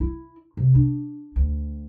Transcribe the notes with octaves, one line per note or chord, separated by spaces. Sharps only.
E4
C3
D4
D2